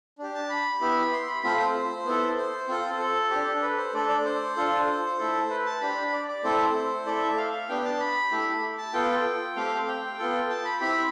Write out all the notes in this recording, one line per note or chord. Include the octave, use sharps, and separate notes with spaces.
D4 G4
A5
B5
B3 E4 G4
C6
B5
A3 C4 F4 B5
C5
B3 E4 A4
C5
C4 F4 A4
A4
D4 G4
B4
C5
A3 D4 A4 D5
D5
C5
D4 F4 A4
A3 E4 A4
B4
A5
D4 G4 B5
D5
D5
A3 C4 E4 A4 C5
A3 E4 A4 D5
E5
F5
F5
B3 D4 G4 G5
A5
B5
A3 E4 G4
A5
B3 F4 A4 G5
A3 C4 G4 F5
G5
B3 F4 A4
A5
B5
C4 E4 G4 B5